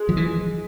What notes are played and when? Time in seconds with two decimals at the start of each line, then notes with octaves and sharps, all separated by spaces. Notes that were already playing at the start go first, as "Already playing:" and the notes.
Already playing: G#3
0.09 F3
0.17 E3